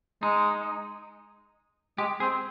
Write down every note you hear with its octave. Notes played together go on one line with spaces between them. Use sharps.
G#3 D#4
G#3 G4
C4 G#4